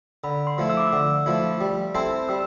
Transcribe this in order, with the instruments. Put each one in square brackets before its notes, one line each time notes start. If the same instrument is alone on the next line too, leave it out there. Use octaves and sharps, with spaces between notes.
[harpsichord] D3 [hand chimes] B5
[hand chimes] C6
[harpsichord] F3 A3 E4
[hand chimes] E6
D6
E6
[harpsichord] D3
F3 A3 E4
G3
C4 E4 A4 C5
[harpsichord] G3 [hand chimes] E6